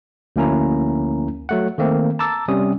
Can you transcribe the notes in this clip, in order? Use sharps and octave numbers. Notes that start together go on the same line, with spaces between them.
D2 F3 A#3 C#4 E4 A#5
F#3 A3 F#5
D#3 A3 A#3 C4
A5 A#5 D6 E6 A6
C3 G3 C#4 D#6